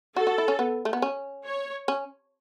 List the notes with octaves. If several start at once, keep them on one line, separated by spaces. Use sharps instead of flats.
F#4 A4
F#4
E4
C#4
B3
A3
B3
C#4
C#5
C#4